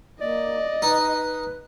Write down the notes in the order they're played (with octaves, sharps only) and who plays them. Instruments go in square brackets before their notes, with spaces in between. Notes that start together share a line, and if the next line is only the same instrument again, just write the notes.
[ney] A#3 [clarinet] D5 [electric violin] D#5
[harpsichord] D#4 [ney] B4